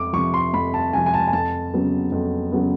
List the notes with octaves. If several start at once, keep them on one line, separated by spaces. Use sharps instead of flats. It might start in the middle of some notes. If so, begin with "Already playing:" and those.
Already playing: F2 D6
C3 F3 C#6
C6
F2 B5
A5
C3 F3 G#5
G#5
A5
G#5
F2 A5
C#3 F#3 B3
F2
C#3 F#3 B3